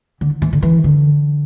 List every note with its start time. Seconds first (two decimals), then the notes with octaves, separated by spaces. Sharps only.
0.21 D3
0.42 E3
0.53 D3
0.62 E3
0.84 D3